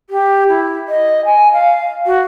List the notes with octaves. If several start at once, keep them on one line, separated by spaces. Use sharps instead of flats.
G4
E4
D#5
G#5
F5
F#4